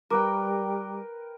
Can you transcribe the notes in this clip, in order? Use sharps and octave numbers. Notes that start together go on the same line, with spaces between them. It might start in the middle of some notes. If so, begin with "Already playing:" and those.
G3 A#4 B4 G5 A#5 D6